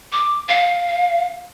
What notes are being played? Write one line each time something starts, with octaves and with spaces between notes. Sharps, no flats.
D6
F5